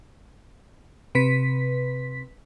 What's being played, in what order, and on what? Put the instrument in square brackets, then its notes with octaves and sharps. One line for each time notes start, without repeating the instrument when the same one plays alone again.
[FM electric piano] C3 B4 B6